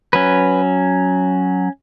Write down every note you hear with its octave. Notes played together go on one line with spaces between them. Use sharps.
F#3 C#4 B4